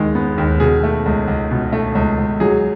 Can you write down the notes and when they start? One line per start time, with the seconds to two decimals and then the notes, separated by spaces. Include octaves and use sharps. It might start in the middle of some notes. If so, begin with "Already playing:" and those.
Already playing: D#2 D#3 G#3
0.15 B3
0.38 D#2
0.60 B2 G#4
0.83 A3
1.06 C#2
1.28 C#2
1.51 B2
1.73 A3
1.95 C#2
2.18 C#2
2.40 F#3 G#4